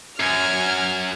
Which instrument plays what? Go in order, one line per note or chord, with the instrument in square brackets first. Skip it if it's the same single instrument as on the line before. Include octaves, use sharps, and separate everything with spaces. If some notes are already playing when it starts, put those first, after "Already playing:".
[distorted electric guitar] F#2 [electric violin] G#5 [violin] F6